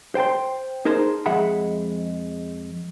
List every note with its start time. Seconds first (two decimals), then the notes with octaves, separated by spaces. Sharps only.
0.15 C5 G5 A5 C6
0.85 D#4 G#4 A#4 C5 A5 C6
1.26 F2 G#3 G#4 E5 F#5 B5